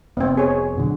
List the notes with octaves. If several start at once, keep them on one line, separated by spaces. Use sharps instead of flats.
F1 B3 C4
G#4 C#5
B2 D3 F#3